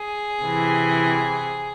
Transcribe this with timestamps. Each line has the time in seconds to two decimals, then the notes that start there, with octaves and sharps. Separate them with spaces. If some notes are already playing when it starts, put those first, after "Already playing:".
Already playing: G#4
0.42 C3 E3